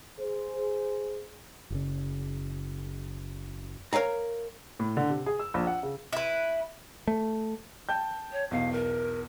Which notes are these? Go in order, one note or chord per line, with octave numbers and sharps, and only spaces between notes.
G#4 C5
F#1 C#3
A#4 B4 C#5 F5 A#5
A2
D3
C3
G#4
E6
A#1
F#5
C#3
E4 B4
A3
G5 A5 G6
C#5
B1 E2 F5
A#4